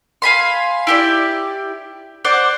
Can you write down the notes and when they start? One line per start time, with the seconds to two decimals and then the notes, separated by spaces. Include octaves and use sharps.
0.22 F5 G#5 B5 C6
0.87 E4 G4 D5
2.24 C5 D5 F#5 D6